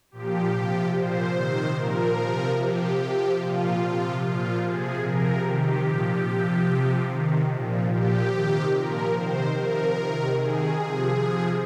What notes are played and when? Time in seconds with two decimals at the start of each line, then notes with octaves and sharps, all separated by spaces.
0.11 A#2 F3 G4
0.53 C3 F3
0.94 A#2 F3 C5
1.35 C3 D#3
1.76 A#2 F3 A#4
2.16 C3 F3
2.58 C3 F3 G4
2.98 C3 F3
3.39 A#2 F3 F4
3.81 C3 F3
4.22 A#2 F3 F4
4.62 C3 F3 G#4
5.03 C3 F3 A#4
5.44 C3 D#3 G4
5.85 A#2 F3
6.27 C3 F3
6.67 C3 F3
7.07 C3 D#3
7.49 A#2 F3
7.89 A#2 F3 G4
8.31 C3 D#3
8.72 A#2 F3 A#4
9.12 C3 D#3 C5
9.53 C3 A#4
9.59 F3
9.94 C3 D#3
10.35 C3 D#3 G#4
10.77 C3 F3
11.18 C3 F3